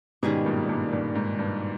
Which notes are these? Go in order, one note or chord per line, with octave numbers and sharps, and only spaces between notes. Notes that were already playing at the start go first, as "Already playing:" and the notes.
G#2 B2 D#3 G3 C#4 G#4
G2 A#2
G2 A#2
G2 A#2
G#2
G2